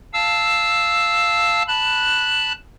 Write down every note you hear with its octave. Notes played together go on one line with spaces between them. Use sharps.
F5 A5 E6
A5 B5 F#6